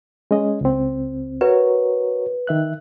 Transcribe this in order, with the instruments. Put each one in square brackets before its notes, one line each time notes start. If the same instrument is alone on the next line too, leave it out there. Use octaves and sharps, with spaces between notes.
[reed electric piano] G#3 C#4 D#5
C#2 C4
[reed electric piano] F#4 A#4 C#5 [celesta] B4
[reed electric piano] D#3 E5 F#6